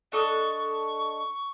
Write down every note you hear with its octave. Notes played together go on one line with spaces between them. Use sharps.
D4 A4 D#5 C#6